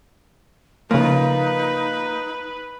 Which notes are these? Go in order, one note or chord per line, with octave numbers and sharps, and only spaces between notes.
C#3 F3 A#3 D#4 F4 B4